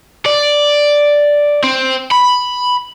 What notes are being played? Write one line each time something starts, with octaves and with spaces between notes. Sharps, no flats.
D5
C4
B5